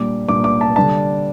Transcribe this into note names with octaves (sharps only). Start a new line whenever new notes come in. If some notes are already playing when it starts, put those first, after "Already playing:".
Already playing: A#2 G3 D4 D6
A#2 G3 D4 D6
D6
A5
D3 G3 D4 A5